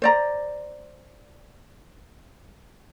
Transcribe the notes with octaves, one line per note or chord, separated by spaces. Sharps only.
C5 D5 A#5